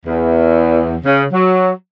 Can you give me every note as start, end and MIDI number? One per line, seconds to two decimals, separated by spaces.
0.06 0.95 40
1.05 1.23 49
1.32 1.71 54